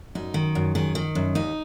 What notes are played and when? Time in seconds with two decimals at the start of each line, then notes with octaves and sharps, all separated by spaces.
0.15 F#2 D#4
0.34 D#3
0.55 F#2
0.75 D#3 G#4
0.95 D#3
1.15 F#2
1.35 D#2 D#4